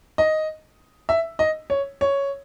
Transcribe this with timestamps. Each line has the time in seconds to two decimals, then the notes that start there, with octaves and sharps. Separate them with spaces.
0.18 D#5
1.09 E5
1.39 D#5
1.70 C#5
2.01 C#5